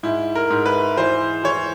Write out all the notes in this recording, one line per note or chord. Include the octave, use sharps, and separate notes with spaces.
G#2 E4
A#4
G#2
B4
E3 C5
E3 C#5